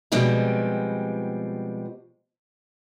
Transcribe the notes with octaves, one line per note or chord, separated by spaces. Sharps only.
B2 F3 G3 G#3 C4